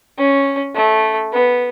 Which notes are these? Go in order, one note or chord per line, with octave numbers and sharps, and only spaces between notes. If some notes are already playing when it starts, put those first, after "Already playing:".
C#4
A3
B3